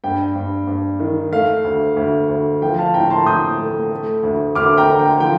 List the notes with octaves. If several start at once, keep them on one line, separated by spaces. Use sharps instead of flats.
G2 G5
G2
G2
D#3
A3 F5
D2
D2
D2
F3 G5
F5 A5
A2 G5 A#5
A5 C6
A2 D#6 G6
A3
A3
D2
D2 D6 F6
G5 A#5
D3
G5
F3 G5